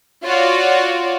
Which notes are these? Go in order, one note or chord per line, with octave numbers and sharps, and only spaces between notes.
F4 F#4 C#5 D5